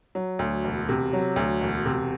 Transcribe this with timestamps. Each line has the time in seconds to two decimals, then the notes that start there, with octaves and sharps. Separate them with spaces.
0.15 F#3
0.39 D2
0.64 E1
0.89 C3
1.13 F#3
1.36 D2
1.61 E1
1.86 C3